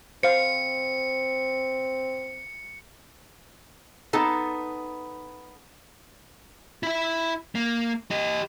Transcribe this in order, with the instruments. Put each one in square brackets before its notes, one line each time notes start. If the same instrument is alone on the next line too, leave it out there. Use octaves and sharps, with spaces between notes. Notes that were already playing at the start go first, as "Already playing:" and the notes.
[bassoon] C4 [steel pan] C5 F5 [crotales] C#7
[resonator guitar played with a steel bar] B3 D#4 A4 A5
[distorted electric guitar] E4 E5
A#3
G4 D#5